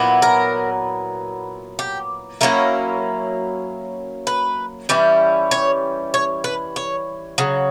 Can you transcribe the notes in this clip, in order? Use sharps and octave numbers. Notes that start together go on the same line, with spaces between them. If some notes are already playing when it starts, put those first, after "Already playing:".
Already playing: A#2 F#3 B3 E4
A#4
G4
F#3 A#3 C#4 E4 A#4
B4
E3 G3 C#4 E4
C#5
C#5
B4
C#5
C#3 F#3